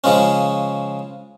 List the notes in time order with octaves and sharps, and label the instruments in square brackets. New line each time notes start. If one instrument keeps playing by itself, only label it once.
[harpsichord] C#3 F3 G#3 C#4